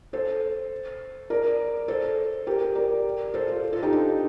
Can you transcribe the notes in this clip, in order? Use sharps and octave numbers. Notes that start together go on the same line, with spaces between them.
A4 C5
A#4 D5
A4 C5
G4 A#4
A#4 D5
A4 C5
F4 A4
F4 A4
D#4 G4
D4 F4